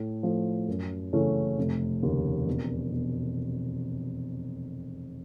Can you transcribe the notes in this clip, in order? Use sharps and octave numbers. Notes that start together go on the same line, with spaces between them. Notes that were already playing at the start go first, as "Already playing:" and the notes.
Already playing: A2
F3 A3
F#2
C#3 E3 A3 C#4
F1
D#2 C#3
E1
B2